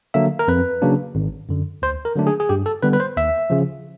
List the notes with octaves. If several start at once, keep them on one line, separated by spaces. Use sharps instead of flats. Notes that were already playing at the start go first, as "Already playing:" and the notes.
D3 F#3 A#3 E5
A#4
F2 B4
C#3 F#3 A#3 D4
G#1
F#2 D3
D2 C5
A#4
D3 F#3 A3 D4
G#4
G#4
G2 G4
A4
D3 G3 B3 B4
B4
C5
D#2 E5
C#3 F3